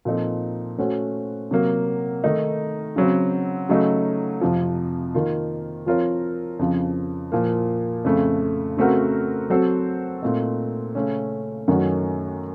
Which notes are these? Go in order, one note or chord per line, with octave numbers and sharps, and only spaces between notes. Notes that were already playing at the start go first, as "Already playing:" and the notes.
A#2 F3 C4 D#4 A4
A3 C#4 F#4 C5
C3 F#3 A#3
D#3 A3 D#4
C#3 F#3 C4
C#3 F#3 A3 D#4
F2 C3 F3
D#3 A#3 F4
F3 C4 F4 A#4 C#5
F2 C#3 F3
A#2 F3 A#3
F2 C#3 A3
C#3 A3 C4 F#4 A#4
F#3 C4 F#4 A4 C5
A#2 A3 C4 D#4
C#3 A3 C#4
F#2 D#3 A3 C#4 F#4